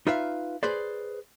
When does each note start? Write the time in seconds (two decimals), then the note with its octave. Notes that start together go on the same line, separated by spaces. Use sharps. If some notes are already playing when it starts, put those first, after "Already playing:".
0.07 D#4 F4 B4 E5 F5
0.63 G#4 B4 C5 D5